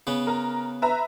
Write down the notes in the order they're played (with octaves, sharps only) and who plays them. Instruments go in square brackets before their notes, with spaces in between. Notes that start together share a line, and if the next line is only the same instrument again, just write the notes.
[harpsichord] C#3 B3
[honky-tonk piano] A#4 A#5
B4 E5 A#5